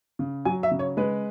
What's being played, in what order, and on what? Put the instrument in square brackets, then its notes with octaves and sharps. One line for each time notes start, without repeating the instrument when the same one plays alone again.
[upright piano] C#3
F#3 G#5
E5
C#3
C#5
G#3 B4